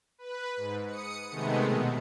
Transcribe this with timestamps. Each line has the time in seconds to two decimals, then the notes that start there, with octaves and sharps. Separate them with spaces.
0.18 B4
0.56 G#2
0.87 D#6 C#7
1.31 C3 D#3 G#3 A3 B3
1.65 B2